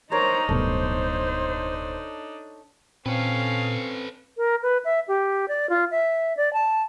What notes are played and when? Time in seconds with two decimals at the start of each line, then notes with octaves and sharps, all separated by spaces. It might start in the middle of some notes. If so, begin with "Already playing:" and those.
0.11 D4 D#4 A#4 C5 C#5 F5 A#5
0.49 D1 G2 B2 A4 C5
3.06 A#2 C4 C#4 A4 B4 F5
4.37 A#4
4.63 B4
4.85 E5
5.08 G4
5.48 D5
5.70 F4
5.91 E5
6.37 D5
6.53 A5